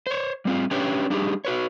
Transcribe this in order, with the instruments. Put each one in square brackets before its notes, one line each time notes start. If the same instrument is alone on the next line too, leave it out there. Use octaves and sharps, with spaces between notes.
[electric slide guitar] C5 C#5
G3 C4 F4
C#4 D4 G4 B4 C#5 G5
G3 D4 D#4 G4 G#4
F#4 B4 C#5